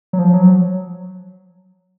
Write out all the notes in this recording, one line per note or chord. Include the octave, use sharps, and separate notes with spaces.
F#3
F3
F#3